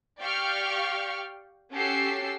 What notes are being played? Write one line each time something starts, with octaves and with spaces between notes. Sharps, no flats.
G4 D5 F5 G5 C#6 F6
C#4 F#4 G4 A4 E6 C7